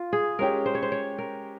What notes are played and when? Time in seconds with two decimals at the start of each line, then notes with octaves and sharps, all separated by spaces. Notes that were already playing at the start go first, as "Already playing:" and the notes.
Already playing: F4
0.13 G#4
0.39 G#3 C#4 G4 A#4
0.66 C5
0.75 C#5
0.83 C5
0.92 C#5
1.18 A#4